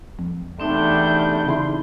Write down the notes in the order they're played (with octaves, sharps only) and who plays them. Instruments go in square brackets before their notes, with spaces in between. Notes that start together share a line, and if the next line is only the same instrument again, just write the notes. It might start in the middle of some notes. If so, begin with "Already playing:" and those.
[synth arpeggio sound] F2
[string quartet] E2 G3 G6 [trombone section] C3 A3 D4 [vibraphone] C4 D#4
[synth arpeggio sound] C#3 E4 C6